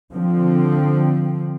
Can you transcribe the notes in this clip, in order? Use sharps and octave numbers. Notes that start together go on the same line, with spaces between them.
D3 F3 C4